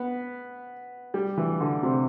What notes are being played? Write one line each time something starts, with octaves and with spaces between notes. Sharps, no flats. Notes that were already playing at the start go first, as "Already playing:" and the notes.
Already playing: B3
G3
E3
D3
C3